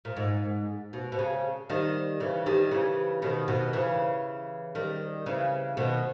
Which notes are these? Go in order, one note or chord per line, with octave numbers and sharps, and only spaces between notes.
A#2
G#2
B2
B2
C#3
D#3 G3
C#3 E3
D#3 G3
C#3 E3
B2 D#3
B2 D#3
C#3 E3
D#3 G3
C#3 E3
B2 D#3